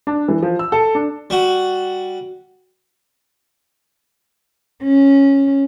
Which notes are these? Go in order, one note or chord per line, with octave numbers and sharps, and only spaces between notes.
D4
E3
F3
E6
A4
D4
G3 F#4
C#4